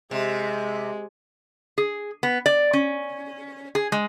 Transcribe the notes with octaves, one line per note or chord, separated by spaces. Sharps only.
C3 G#3
G#4
B3
D5
C#4
G#4
G#3